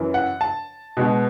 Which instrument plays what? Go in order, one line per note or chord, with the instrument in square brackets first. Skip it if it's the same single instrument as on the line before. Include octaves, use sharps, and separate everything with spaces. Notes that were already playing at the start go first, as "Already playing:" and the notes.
Already playing: [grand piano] F#2 E3
F#5
A5
B2 G#3 B3